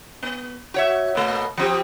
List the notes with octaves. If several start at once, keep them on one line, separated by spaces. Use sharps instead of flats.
B3
F#4 C#5 E5
B2 A3
F3 C4 G4